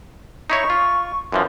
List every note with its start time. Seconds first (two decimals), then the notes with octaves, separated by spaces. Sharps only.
0.50 D#4 E4 C#5 C#6
0.70 F4
1.32 F#2 E3 F3 C6